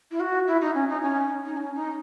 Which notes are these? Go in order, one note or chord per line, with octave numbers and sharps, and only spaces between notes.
E4
F#4
E4
D#4
C#4
D#4
C#4
D#4
C#4
D#4